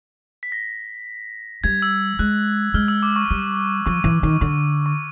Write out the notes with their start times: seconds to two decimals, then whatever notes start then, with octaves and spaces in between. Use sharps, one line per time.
0.43 B6
0.52 A#6
1.64 G3 G#6
1.82 E6
2.19 G#3 F#6
2.74 G#3 F6
2.88 E6
3.03 D6
3.16 C#6
3.31 G3
3.86 F3 C#6
4.04 E3
4.23 D#3
4.41 D3 C#6
4.86 C#6